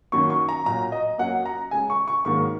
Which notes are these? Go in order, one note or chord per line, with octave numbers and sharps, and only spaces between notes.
F#2 D#3 F#3 A#3 C#6
C#6
A#5
A#2 F#3 A#3 A#5
D#5
F#2 F#3 A#3 F#5
A#5
C#3 G#3 G#5
C#6
C#6
G#2 D#3 F#3 A#3 C#6